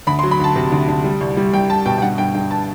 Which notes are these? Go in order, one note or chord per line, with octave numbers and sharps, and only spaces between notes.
D2 B5
C6
F#3
B5
D2 A5
C3
D2
D2
G3
C2
G3
C2 G5
C2 A5
B2 G5
G5
G2 F#5
G2 G5
G2 G5
A5